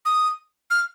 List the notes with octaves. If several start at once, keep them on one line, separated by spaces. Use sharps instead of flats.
D#6
F6